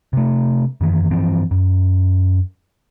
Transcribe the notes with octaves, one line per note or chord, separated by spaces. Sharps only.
C3 A3
F#2 D#3 E3
G2 E3 F3 C4
F#2